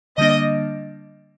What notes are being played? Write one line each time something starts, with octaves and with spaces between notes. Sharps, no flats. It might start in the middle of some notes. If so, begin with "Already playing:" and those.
D3 G3 A#3 D4 D#5